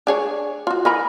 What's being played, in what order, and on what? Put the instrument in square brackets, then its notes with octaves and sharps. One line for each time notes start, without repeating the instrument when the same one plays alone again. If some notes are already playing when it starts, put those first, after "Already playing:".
[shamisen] D4 G#4 C#5
F4 F#4
[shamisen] E3 G#5 A#5 [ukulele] A#4 D#5 B5